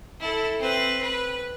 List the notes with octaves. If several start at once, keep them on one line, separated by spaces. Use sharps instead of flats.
E4 A4
C4 B4
B4